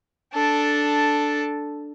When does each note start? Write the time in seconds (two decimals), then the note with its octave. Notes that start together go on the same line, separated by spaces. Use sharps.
0.34 D4 A4